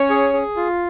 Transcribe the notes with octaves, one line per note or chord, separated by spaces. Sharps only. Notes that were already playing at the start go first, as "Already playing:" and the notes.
Already playing: C#4 C#5
G#4
G#4
F4